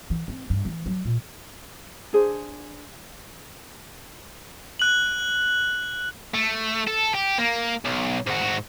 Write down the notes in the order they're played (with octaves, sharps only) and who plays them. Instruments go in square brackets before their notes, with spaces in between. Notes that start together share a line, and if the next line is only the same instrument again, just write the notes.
[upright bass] E3
C4
G2
E3
F#3
A#2
[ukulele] D4 G#4 C5
[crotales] F#6 F#7
[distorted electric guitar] A3
A4
G4
A#3
B1
G#2 F#4